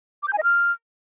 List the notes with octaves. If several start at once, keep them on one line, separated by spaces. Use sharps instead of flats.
D6
G6
G#5
D#5
F6